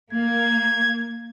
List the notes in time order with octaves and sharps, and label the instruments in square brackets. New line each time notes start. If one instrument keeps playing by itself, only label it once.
[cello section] A#3 [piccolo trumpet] G#6